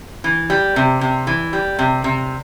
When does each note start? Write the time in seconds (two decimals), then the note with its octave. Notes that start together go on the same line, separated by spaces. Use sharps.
0.24 E3
0.50 G3
0.76 C3
1.01 C3
1.27 E3
1.53 G3
1.79 C3
2.04 C3